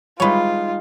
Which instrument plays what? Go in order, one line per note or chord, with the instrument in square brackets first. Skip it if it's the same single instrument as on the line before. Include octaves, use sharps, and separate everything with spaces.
[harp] G3 G#3 D#4 [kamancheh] F4 [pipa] B4 C#5